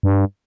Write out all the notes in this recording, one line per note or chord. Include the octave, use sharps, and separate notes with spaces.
G2